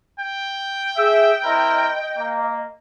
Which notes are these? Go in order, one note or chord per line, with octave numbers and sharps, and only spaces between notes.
G5
G#4 E5
C4 E4 A#4 D#5
A#3